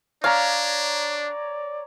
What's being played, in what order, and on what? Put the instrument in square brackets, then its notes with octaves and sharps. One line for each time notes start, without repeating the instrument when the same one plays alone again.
[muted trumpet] D4 [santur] C#5 A#5 [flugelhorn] D5 [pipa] F5